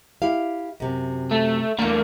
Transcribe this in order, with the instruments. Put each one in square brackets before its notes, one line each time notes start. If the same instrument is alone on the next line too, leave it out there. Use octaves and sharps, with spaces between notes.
[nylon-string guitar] E4 G4 F5
F#2 C3
[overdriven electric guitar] A3
[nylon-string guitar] E2 D4 [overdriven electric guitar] A3 A#3